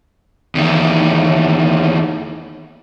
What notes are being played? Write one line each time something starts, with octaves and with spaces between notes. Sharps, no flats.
E2 D#3